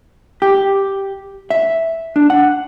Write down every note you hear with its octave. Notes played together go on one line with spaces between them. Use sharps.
G4
E5
D4
F#5